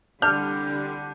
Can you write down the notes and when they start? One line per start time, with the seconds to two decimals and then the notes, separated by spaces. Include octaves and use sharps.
0.22 C2 D3 G3 D4 F6 G6